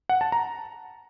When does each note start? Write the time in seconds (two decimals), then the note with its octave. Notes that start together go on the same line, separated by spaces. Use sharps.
0.09 F#5
0.21 A5
0.32 A#5